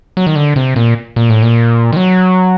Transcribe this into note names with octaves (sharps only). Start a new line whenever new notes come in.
F#3
D#3
D3
C3
A#2
A#2
A2
A#2
D#3
F#3